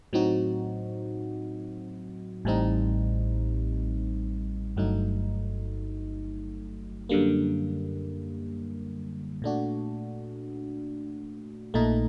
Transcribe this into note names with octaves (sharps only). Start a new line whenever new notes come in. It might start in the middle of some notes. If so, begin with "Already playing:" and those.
A2 F#3 C4 D#4 F#4
A1 A2 G3 C4 D#4
G1 G2 F#3 A3 D#4
F#2 D3 G3 A#3
A#2 A3 D4 F#4
A#1 A#2 A3 D#4